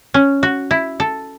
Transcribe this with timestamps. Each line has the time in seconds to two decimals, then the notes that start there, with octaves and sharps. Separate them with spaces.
0.14 C#4
0.43 F#4
0.71 E4
1.00 A4